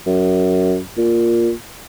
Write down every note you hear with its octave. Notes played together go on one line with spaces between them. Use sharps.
F#2
A#2